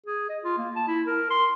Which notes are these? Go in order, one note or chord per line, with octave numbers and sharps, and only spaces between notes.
G#4
D#5
F4
A#3
A5
E4
A#4
C6